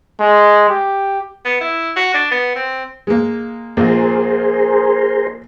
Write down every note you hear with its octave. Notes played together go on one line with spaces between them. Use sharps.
G#3
G4
B3
E4
F#4
D4
B3
C4
G#3 A#3
A#1 A#2 G#4 A#4 C5